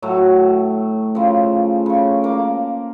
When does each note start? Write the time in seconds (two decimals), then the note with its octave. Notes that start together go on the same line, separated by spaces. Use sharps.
0.02 A2 F#3 A3
1.15 C#3 F3
1.86 C#3 C#6
2.24 A#3 D6